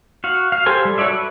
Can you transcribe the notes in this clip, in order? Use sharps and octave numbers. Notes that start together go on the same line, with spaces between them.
F#4 F5
F5
G4 A4 C5 G#5
G3
F#4 A4 C#5 D5 E5
B4